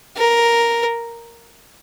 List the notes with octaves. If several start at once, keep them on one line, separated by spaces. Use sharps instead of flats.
A#4